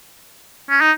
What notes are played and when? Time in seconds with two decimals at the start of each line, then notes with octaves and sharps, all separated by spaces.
0.70 C#4
0.81 D#4